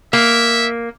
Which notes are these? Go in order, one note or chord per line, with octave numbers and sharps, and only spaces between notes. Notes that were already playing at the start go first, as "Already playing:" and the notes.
A#3 E5